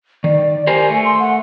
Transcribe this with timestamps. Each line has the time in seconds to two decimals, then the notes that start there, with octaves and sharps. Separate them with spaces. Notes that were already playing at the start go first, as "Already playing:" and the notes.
0.24 D#3 D5
0.67 G4 A#4 C5 G#5
0.89 A3
1.05 C6
1.20 F#5